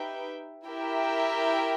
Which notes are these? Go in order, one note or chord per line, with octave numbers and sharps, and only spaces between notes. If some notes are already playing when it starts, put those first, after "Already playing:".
Already playing: D#4 G4 B4 E5 G5
E4 G4 A#4 E5 G5